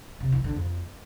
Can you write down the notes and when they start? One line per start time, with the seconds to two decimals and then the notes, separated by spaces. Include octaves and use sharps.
0.20 C3
0.32 E3
0.44 D3
0.56 F2